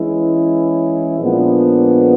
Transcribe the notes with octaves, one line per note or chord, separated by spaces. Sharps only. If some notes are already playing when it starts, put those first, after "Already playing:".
Already playing: E3 G#3 C#4 E4
A#2 F3 G#3 B3 D4